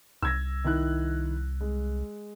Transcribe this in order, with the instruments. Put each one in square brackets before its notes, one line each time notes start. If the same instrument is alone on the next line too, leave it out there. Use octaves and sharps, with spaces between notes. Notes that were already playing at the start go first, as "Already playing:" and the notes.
[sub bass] C2 [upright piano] E6 G#6 A#6
[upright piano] D#3 E4 F#6
G#3